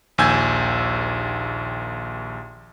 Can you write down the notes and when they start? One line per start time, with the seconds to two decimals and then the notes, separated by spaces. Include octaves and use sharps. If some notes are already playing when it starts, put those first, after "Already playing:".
0.18 A#1 D#2 G#5 E6 G6 G#6